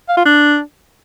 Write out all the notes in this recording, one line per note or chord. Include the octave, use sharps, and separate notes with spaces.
F5
F4
D4